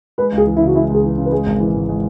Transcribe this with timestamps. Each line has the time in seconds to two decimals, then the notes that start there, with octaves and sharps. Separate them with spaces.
0.18 G#3 B4
0.32 C#2
0.38 G#4
0.46 E3
0.56 E4
0.61 C#3
0.67 F#4
0.75 G#3 E4
0.90 C#2 G#4
1.04 E3
1.18 C#3
1.25 B4
1.32 G#3 G#4
1.46 G#1
1.60 E3
1.75 G#2
1.89 G#3